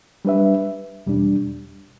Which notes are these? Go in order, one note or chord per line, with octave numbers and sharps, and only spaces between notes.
G3 D4 B4 E5
E2 B2 G3 D4